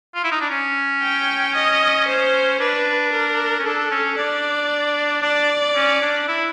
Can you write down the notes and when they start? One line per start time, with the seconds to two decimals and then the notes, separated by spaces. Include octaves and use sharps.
0.15 F4
0.24 E4
0.32 D#4
0.41 D4
0.50 C#4
1.02 G5
1.55 D#5
2.08 C5
2.60 D4 B4
3.13 A#4
3.59 C#4
3.65 D4 A4
3.91 C#4
4.17 D4 D5
5.22 D4 D5
5.76 C#4
6.02 D4
6.28 E4